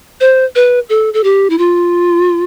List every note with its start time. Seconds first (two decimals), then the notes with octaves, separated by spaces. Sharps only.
0.20 C5
0.55 B4
0.89 A4
1.14 A4
1.24 G4
1.50 E4
1.58 F4